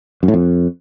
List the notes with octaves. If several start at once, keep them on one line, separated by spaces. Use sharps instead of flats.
F#2
A2
F2